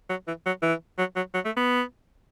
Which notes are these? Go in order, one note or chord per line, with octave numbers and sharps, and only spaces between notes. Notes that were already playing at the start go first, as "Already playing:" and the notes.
F#3
E3
F#3
E3
F#3
F#3
F#3
A3
B3